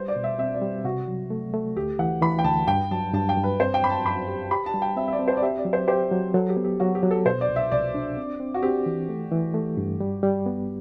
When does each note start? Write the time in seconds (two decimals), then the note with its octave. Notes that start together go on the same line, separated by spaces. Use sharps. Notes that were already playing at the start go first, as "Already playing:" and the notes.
Already playing: G3 C5
0.08 D5
0.16 B2
0.24 E5
0.39 C4 E5
0.54 D5
0.62 G3
0.84 C3 F#4
1.08 F#3
1.30 A3
1.54 A3
1.76 D2 G4
1.99 E3 F#5
2.22 E3 B5
2.39 G5
2.44 D2 A5
2.68 G2 G5
2.91 F#3 A5
3.13 G2 A5
3.29 G5
3.37 G2
3.44 B4
3.59 C4 C5
3.74 G5
3.82 F#2 B5
3.90 A5
4.05 F#2 B5
4.28 G4
4.51 G4 B5
4.66 A5
4.74 G3
4.82 G5
4.97 C4 E5
5.08 E5
5.13 D5
5.19 C4
5.28 C5
5.37 D5
5.42 G4 E5
5.58 D5
5.65 F#3
5.73 C5
5.88 G4 C5
6.11 F#3
6.34 F#3 A4
6.49 G4
6.57 B3
6.64 G4
6.80 F#3 F#4
6.95 G4
7.03 F#3
7.11 A4
7.26 B2 C5
7.41 D5
7.49 C2
7.56 E5
7.72 C2 D5
7.95 D4
8.17 C4
8.40 C4
8.54 F#4
8.62 C4 G4
8.86 E3
9.09 A3
9.32 E3
9.54 A3
9.77 G2
10.00 G3
10.23 G3
10.46 B3